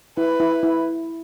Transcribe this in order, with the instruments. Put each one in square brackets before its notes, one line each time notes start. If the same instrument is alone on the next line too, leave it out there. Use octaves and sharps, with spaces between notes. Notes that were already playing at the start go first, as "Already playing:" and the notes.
[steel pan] E4 [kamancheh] B4
[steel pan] E4
E4